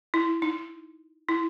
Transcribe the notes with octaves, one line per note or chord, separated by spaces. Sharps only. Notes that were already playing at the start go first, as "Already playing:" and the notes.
E4
D#4
E4